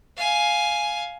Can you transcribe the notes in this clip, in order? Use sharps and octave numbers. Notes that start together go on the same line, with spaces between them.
F5 G#5